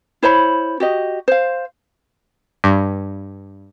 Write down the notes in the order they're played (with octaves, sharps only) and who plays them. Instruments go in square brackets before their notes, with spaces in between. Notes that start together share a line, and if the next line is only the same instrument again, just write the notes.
[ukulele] E4 C5 C#5 B5
F#4 G4 D#5
C5 F5
[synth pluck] G2